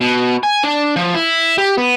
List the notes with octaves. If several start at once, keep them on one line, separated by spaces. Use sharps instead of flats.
B2
G#5
D4
F3
E4
G4
B3